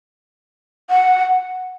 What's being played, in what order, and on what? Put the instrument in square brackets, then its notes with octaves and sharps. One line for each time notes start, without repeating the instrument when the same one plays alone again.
[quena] F#5